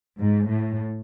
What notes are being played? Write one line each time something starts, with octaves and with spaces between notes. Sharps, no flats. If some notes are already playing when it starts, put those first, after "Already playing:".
G#2
A2